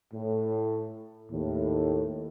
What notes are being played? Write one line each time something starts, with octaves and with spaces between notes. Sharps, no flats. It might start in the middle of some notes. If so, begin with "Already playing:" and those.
A2
D#2 A2